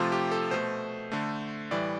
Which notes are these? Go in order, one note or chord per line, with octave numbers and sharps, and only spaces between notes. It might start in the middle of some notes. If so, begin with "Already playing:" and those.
Already playing: C3 F3 A3 F4
G4
A4
B2 A3 C5
D3 A3
A2 E3 G3 D5